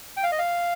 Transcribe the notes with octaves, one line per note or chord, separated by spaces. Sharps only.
G5
F5
D#5
F5